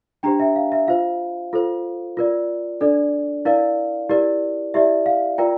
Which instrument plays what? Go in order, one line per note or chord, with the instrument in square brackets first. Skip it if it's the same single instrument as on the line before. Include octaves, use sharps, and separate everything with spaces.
[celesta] D4 G4 C5 G5 A#5
E5 G5
F5
E5
F4 C5 F5
F4 A4 C5
F4 A#4 D5
D4 A4 D5
E4 A#4 D5 F5
E4 G4 A#4 D5
E4 G4 D5 E5
F5
F4 A#4 D5 G5 A#5